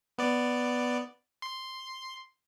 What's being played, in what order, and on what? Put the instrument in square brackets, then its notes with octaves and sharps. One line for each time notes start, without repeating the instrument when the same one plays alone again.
[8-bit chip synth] B3 D5
C6